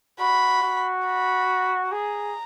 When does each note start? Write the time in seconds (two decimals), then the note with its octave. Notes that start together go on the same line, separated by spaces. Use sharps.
0.20 F#4 B5
0.62 F#4
1.06 B5
1.92 G#4 A#5